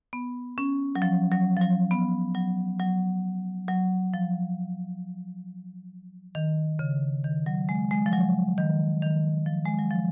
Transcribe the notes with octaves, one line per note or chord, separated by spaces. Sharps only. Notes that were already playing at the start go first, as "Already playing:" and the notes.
B3
C#4
F#3
F3
F#3
F3
F#3
B3
F#3
F#3
F#3
F3
D#3
C#3
D#3
F#3
G#3
G#3
F3
F#3
D#3
D#3
F3
G#3
F#3
F3